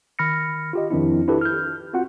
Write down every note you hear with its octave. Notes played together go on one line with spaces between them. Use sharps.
D#3 B5 F6 A#6 C#7
F4 G4 D#5
F2 D#3 F3 C4 D4 E4
D4 E4 F4 G4 A4 B4
F6 G6
C4 F4 F#4 F#5